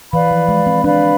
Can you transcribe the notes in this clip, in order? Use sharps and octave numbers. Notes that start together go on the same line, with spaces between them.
E3 B4 D5 F5 B5
F3
G#3
C4
D4 B4 D5 F5 B5